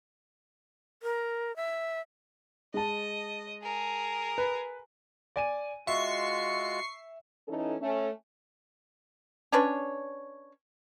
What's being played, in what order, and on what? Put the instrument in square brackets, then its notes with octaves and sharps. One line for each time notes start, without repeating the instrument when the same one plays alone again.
[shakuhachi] A#4
E5
[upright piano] G#3 A5 [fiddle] D#5
[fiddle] G#4 A#4
[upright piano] B4
[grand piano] D5 G#5 D#7
[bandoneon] G#3 F4 F#4 [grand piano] E5 [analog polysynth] C#6 C7
[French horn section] E3 C#4 D#4 A4
A3 C#4
[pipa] C#4 D4 B4 C#5